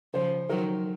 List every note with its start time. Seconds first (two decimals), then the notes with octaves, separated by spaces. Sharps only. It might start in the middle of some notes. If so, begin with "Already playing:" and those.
0.14 C#3 F3 C5
0.49 D#3 F#3 A#4